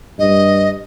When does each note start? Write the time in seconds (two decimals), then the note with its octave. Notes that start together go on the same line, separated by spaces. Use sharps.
0.19 G2 D#5